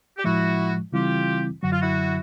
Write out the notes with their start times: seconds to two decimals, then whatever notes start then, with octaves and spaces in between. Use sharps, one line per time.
0.17 G4
0.23 A2 F3 G#3 E4 F#4
0.93 C#3 E3 G3 C4 E4 F4 G4
1.62 F#2 D3 F#3 F#4
1.71 F4
1.80 E4 F#4